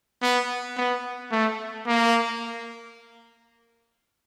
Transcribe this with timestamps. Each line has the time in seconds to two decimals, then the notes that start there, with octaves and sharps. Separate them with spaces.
0.22 B3
0.77 B3
1.32 A3
1.87 A#3